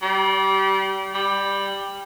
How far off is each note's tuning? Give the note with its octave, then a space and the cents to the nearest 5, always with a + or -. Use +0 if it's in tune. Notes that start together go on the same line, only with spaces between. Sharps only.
G3 -25
G3 +10